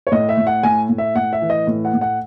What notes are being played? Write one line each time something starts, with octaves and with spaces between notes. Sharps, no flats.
C#5
A2 D#5
E5
A2
F#5
A2 G#5
A2
E5
A2 F#5
E5
E3
D#5
A2
F#5
A2
F#5